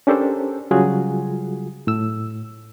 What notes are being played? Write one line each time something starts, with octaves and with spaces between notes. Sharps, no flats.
C#4 D4 G4 A4 A#4 C5
C#3 F#3 G3 F4 F#4 G#4
A2 E6